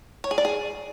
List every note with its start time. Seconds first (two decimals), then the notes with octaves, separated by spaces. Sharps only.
0.24 C#5
0.31 G#4
0.38 D5
0.45 G#4